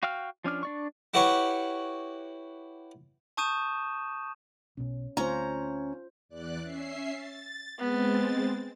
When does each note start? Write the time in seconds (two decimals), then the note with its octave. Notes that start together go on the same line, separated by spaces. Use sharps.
0.03 F#4 F5 G5 F6
0.44 F3 C#4 D4 F6
0.63 D4 D5 C#6
1.14 E4 F#4 G4 B4 C#5 C#6
3.37 A5 C#6 D#6 G6 D#7 E7
4.77 B1 B2 C#4
5.17 D2 A3 C4 C#4 F4 C5 A#5
6.29 E2 D5 F#6
6.62 C#4 E5 C7
7.13 A6
7.79 G#3 B3 C4 A6